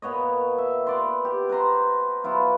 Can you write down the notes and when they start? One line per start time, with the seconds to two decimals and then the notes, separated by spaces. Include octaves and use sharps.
0.02 A#2 B3 C#5 D#5
0.58 E5
0.87 B3 D5 C6
1.24 G4
1.49 B4 C5 A#5 C6
2.24 F#3 B3 E4 F4